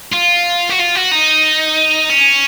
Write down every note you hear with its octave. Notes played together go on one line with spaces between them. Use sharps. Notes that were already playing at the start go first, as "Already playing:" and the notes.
F4
F#4
F4
F#4
D#4
C#4